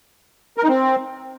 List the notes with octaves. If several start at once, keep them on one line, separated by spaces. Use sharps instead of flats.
A#4
D#4
C4